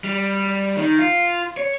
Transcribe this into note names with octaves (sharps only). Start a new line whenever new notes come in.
G3
D#3
F4
C#5